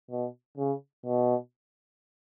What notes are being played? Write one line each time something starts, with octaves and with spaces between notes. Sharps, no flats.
B2
C#3
B2